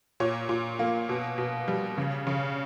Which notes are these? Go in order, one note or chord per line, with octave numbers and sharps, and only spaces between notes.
A#2 C#5
A#2
A#3
B2
B2
G3
C#3
C#3